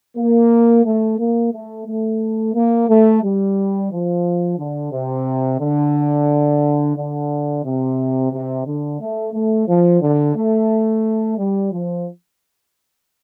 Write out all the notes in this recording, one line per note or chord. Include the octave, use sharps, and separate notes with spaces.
A#3
A3
A#3
A3
A3
A#3
A3
G3
F3
D3
C3
D3
D3
C3
C3
D3
A3
A3
F3
D3
A3
G3
F3